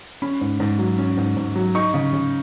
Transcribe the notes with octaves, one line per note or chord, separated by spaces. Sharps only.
C#4 B5
G#2
G#2
F#3
C#4
G#2
G#2
F#3
D#4 C#6
C#3
C#3